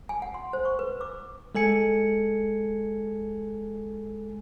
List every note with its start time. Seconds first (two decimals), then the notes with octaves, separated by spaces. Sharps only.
0.09 G#5
0.22 F#5
0.34 C6
0.53 C5
0.65 C#6
0.79 B4
1.01 D6
1.55 G#3 A4 G#5 C#7